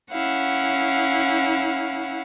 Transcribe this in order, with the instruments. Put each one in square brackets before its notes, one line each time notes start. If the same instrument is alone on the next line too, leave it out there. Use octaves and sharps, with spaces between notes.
[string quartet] C#4 E4 F5 F#5